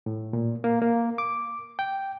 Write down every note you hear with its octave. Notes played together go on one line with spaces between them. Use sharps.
A2
A#2
A#3
A#3
D6
G5